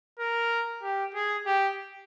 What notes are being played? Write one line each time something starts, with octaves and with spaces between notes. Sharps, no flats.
A#4
G4
G#4
G4